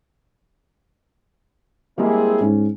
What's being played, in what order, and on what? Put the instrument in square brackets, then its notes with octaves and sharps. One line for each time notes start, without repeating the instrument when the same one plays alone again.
[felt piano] G3 G#3 A#3 [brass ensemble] C4 E4 G#4
[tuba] G#2 [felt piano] C#4